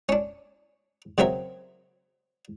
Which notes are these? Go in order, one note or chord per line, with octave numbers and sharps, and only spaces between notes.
C#4 D4
C#3 F#3 C4 A#4 E5